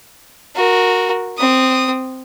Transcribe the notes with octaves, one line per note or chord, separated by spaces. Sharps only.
F#4 A#4
C4 D#6